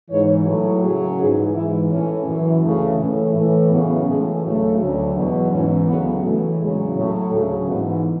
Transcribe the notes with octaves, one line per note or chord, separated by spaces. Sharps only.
G#2 E3 C#5
A2 F#3 B4
F#2 C#3 F#3 G#4
G#2 E3 G#4
G#2 E3 E4
A2 E3 C#4
F#2 E3
D2 C#3 E3 A3
A2 E3
A2 E3
F#2 C#3 E3 B3
A2 E3 G#3
D2 C#3 F#3 A3
D2 D3 F#3
E2 B2 F#3
G#2 E3 C#4
D2 C#3 F#3 B3
A2 E3 A3
E2 C#3 F#3 G#3
A2 F#3
D2 C#3 F#3 A3
G#2 E3 B3